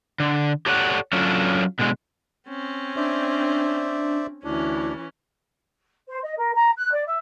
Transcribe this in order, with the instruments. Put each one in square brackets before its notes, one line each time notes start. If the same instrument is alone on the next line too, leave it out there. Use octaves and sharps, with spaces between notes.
[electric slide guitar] D3
G4 A4 C#5 D5 E5 F#5
F#3 C#4 D4 F4 A4 C#5
B2 D3 G#3
[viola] C4 C#4
[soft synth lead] D4 [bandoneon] C5 D5 E5
[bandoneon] D2 D4 [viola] E3 C#4 [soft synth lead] E4
[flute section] C5
D#5
A#4
A#5
F#6
D5
E5